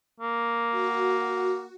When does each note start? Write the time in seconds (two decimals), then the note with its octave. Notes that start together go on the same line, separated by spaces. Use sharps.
0.20 A#3
0.71 F#4